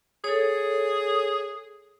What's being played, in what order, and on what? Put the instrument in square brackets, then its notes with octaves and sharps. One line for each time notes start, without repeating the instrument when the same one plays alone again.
[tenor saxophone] G#4 [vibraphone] A4 C#5